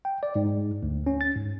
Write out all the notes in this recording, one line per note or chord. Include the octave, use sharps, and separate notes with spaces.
G5
D5
G#2
D2
C#4
A6
G#2